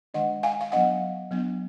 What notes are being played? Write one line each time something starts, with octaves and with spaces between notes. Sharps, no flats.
D#3 G#3 D4 D#5 F#5
F5 G#5
F5
F#3 B3 D4 D#5 F#5
F#3 B3 D4